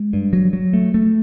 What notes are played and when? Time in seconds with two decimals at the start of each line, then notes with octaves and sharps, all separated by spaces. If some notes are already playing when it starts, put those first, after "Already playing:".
Already playing: G#3
0.13 G2
0.33 F#3
0.53 F#3
0.73 A3
0.94 A3